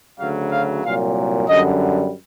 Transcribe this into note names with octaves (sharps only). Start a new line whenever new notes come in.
D2 C#3 F#3 F5
F5
C2 A#2 F#3 F5
F#2 D3 G3 D#5